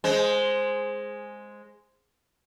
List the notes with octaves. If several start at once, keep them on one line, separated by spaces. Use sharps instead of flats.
G#3 C5